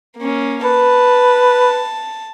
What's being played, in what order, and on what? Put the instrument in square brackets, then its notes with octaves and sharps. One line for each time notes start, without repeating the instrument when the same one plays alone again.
[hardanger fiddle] A#3 C#4
[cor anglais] B4 [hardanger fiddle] A5